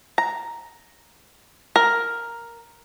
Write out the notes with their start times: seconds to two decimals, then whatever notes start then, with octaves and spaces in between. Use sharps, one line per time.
0.18 A#5
1.76 A#4